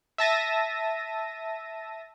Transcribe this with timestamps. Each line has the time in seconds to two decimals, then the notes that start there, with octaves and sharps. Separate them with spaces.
0.18 E5 A5 A#6 D#7